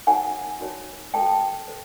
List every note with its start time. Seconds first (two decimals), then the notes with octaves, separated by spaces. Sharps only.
0.07 D#4 F#4 A#4 C#5 F#5 G#5
0.61 D#4 F#4 A#4 C#5
1.14 F#4 A4 C5 G5 A5
1.68 A4 C5